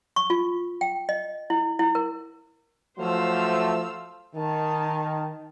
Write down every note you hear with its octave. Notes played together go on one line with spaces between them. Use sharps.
C#6
F4
G5
D#5
E4
E4
A#4
F3 F#3 A3 C5 F5 E6
D#3 D#4 A5